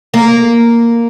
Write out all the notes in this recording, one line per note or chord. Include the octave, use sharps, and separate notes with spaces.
A#3